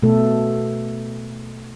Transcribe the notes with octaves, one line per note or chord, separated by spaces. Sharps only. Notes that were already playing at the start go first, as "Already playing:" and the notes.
B2 A3 A4